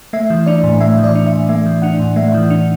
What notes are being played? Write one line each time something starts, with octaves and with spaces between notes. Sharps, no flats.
A3 E5
E3
D4 D5
A2
A3 E5
E3
D5
D4
E5
A2
A3 E5
E3
D4 F#5
A2
A3 E5
E3
D4